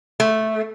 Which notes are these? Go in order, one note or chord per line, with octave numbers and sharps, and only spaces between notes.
A3